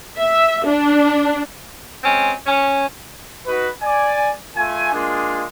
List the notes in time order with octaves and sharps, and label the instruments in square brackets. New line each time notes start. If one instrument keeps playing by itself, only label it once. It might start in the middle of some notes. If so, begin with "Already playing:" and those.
[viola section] E5
D4
[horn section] G#3 C4 C#4
C#4
[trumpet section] D#4 F#4 B4
D5 G#5
A3 F4 G#5
G#3 A#3 D4 F4 G#4